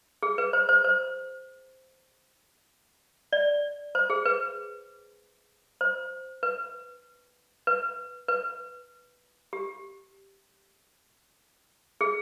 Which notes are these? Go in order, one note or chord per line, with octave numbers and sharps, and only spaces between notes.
G#4
B4
C5
C5
C5
D5
C5
G#4
B4
C5
B4
B4
B4
G4
G#4